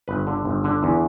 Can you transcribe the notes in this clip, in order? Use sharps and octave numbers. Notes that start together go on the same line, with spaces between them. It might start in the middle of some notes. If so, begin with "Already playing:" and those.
G1 B4
D3
G1
D3
E2